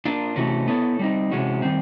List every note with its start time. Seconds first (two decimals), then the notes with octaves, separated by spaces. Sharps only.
0.05 A#3 D4 F4
0.36 C3 E3 A3 C#4 F#4
0.68 B3 E4 A4 C#5
0.99 G3 C4 D#4
1.31 C3 E3 G#3 C#4 F#4
1.62 D#3 G3 C4